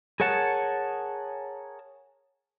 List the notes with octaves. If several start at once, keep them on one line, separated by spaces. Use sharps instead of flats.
G#4 A#4 C#5 F#5 A5